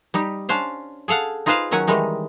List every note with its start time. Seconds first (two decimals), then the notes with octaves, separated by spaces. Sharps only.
0.14 G3 D#4 G4
0.49 C#4 D4 C5 F5
1.08 G#4 A4 F5 F#5
1.46 D#4 F4 G#4 B4 C5 F5
1.71 D#3 F#3 C#4 F#5 G#5
1.87 D#3 E3 G3 G#3 D#4